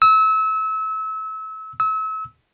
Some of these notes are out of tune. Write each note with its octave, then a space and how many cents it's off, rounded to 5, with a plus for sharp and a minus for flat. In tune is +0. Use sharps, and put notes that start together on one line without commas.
E6 -30
E6 -35